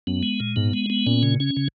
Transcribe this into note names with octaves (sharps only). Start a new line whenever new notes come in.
F#2 B3
G#3
A#2
G#2 B3
G#3
B3
A#2 C#4
C#3
C#4
C#3